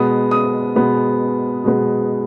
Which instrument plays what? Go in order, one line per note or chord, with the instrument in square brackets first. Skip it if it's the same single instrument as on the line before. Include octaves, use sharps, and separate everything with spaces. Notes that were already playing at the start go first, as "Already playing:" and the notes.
Already playing: [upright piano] B2 G#3 B3 D#6
D#6
B2 G#3 B3
B2 G#3 B3